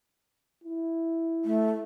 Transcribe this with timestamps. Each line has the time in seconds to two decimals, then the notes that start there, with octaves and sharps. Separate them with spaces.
0.64 E4
1.45 A3